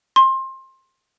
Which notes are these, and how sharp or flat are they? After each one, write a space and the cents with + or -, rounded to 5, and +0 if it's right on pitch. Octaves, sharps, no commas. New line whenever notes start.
C6 +25